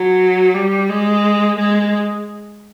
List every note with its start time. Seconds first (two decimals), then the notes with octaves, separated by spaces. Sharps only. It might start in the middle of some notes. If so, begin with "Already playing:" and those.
Already playing: F#3
0.54 G3
0.89 G#3
1.58 G#3